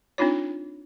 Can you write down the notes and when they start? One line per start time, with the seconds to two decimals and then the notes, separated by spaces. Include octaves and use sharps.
0.18 C4 D4 D#4 F4 C#5